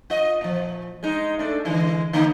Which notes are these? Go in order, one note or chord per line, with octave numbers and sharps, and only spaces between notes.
F4 D#5
A#2 F3
G#3 D#4
A3 D4
D3 E3 G#3
D3 A#3 D#4